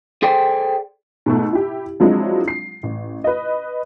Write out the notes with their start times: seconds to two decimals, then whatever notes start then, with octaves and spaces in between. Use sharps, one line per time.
0.23 G#4 A4 C5 D5 G5
1.26 G#2 B2 A3
1.53 E4 G4
2.00 F3 F#3 G#3 C4 D4 E4
2.48 C7
2.83 A1
3.24 B4 D#5